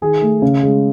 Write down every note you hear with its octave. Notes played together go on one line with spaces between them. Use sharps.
D#3 G#4
A3
C#3
G#3